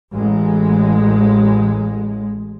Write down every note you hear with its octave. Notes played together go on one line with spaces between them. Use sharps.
A1 G#3